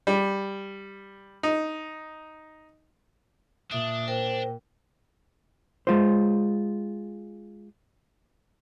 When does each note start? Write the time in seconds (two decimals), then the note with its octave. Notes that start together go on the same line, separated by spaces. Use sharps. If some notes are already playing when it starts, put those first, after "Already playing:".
0.07 G3
1.43 D#4
3.71 A#2 D4 E5 D#6
4.08 A#4 C5 G5
5.87 G#3 F4 C5